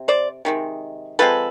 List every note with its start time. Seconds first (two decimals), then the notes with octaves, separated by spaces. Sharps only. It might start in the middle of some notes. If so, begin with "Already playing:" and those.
Already playing: C3
0.08 C5 D5
0.45 C3 D#3 G#3
1.19 F3 G#3 C4 A4 B4